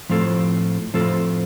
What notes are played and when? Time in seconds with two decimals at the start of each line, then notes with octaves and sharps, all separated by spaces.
0.09 A2 F3 C4 F4 A4
0.94 A2 F3 C4 F4 A4